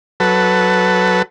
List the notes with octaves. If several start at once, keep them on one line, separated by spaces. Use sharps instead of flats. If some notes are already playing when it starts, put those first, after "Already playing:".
F#3 A4 B4